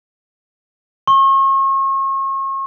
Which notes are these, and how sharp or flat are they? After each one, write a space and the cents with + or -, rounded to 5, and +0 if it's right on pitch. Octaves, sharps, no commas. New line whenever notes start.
C#6 -40